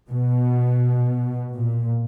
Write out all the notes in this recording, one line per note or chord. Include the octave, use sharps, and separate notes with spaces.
B2
A#2